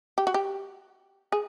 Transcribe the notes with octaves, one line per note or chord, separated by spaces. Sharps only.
G4
F#4
G4
G#4